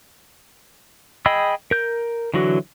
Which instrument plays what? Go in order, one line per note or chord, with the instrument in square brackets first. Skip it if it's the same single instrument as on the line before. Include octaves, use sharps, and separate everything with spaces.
[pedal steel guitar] G#4 D#5 G5 B5 E6
A#4 G6
D3 E3 F#3 F#4